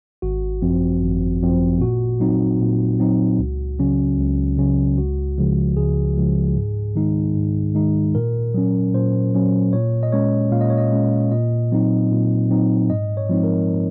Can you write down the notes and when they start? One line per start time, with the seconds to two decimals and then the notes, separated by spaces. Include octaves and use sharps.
0.22 G#1 F#4
0.62 F#2 F3 C4
1.01 G#1
1.42 F#2 F3 C4
1.80 A#2 F#4
2.20 F#3 C4 D#4
2.60 A#2
3.00 F#3 C4 D#4
3.39 C#2
3.79 C#3 F#3 C#4
4.19 C#2
4.58 C#3 F#3 C#4
4.98 C#2 F#4
5.38 C#3 F3 G#3
5.77 C#2 G#4
6.17 C#3 F3 G#3
6.56 G#2
6.96 D#3 G#3 D#4
7.36 G#2
7.75 D#3 G#3 D#4
8.15 A#2 A#4
8.54 F#3 C#4
8.94 A#2 C5
9.34 F#3 C#4
9.73 A#2 C#5
10.03 D#5
10.12 G#3 C#4 C#5
10.52 A#2 F5
10.61 D#5
10.70 C#5
10.78 D#5
10.92 G#3 C#4
11.32 A#2 D#5
11.72 F#3 C4 D#4
12.12 A#2
12.50 F#3 C4 D#4
12.90 G#2 D#5
13.17 C#5
13.29 F3 G#3 C4 D#4
13.44 A#4